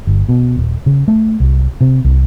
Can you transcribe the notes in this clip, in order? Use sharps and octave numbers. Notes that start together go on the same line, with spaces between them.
G1
B2
D#1
C#3
A3
C2
C3
C2